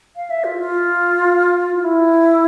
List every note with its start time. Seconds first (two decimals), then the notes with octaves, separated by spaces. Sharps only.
0.16 F5
0.30 E5
0.44 F4
0.58 F4
1.76 F4
1.84 E4